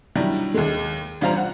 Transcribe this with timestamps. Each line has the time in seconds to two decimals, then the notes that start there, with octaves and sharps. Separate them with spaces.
0.16 D#3 F#3 G3 D4 E4
0.54 D#2 G#3
1.21 A1 G3 F4 C5 A#5
1.37 F#5